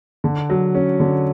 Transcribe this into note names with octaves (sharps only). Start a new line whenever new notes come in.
D3
F#3
C#4
D3